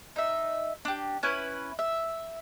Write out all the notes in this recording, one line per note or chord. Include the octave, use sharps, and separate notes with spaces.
D#4 E5
D4 G4
C#4 E4 B4
E5